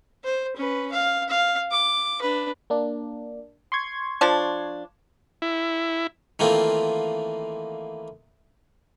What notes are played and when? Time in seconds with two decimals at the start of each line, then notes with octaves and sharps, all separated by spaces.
0.24 C5
0.56 C#4 B4
0.92 F5
1.29 F5
1.71 D6
2.21 D4 B4
2.70 A#3 D4
3.72 C6 C#6 G#6
4.21 F3 D4
5.42 E4
6.39 D#3 E3 A3 A#3 C4 F4